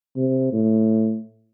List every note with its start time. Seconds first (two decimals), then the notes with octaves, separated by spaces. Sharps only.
0.17 C3
0.53 A2